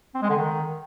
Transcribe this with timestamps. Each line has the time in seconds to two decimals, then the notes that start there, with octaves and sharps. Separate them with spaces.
0.14 C4
0.22 G#3
0.29 D3
0.37 D#3